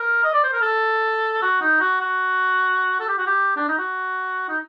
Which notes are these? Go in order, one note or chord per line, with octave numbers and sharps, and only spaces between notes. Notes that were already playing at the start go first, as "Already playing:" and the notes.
Already playing: A#4
D#5
D5
C5
A#4
A4
F#4
D#4
F#4
F#4
A4
G4
F#4
G4
D4
D#4
F#4
D#4